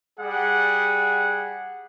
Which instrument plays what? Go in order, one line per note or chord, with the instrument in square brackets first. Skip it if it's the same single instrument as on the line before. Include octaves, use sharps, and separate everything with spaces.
[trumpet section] G3 G#4 F#5